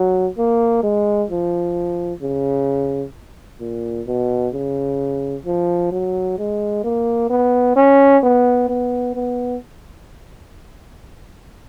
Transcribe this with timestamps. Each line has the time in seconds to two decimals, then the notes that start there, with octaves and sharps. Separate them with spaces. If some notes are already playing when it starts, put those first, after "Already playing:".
Already playing: F#3
0.38 A#3
0.83 G#3
1.30 F3
2.22 C#3
3.60 A#2
4.07 B2
4.53 C#3
5.45 F3
5.92 F#3
6.38 G#3
6.84 A#3
7.30 B3
7.76 C#4
8.23 B3
8.69 B3
9.15 B3